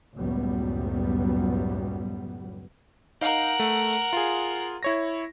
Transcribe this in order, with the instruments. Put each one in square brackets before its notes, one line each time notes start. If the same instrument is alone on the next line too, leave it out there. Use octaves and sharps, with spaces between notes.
[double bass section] F#1 C#2 A2 F#3 G3 B3
[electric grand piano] D#4 F5 [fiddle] A#4 F#5
[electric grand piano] A3
F4 G#4
E4 C#5 A#6